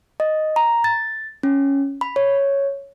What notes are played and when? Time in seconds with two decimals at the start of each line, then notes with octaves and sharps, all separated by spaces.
0.20 D#5
0.56 A#5
0.84 A6
1.43 C#4
2.01 B5
2.16 C#5